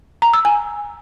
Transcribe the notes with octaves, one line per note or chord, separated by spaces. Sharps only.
A#5
E6
G#5